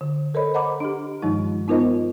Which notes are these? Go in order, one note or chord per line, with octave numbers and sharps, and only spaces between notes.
D3
A4 A#4 C5 C#5 D#5 B5
C5 D#5 F#5 A#5 B5 D6
D4 G4
G2 D#3 F3 G#3 D#4
B3 D#4 F4 A#4 C5 D#5